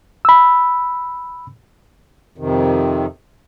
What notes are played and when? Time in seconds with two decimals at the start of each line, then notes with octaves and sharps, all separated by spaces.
0.25 B5 E6
2.38 F2 C3 D#3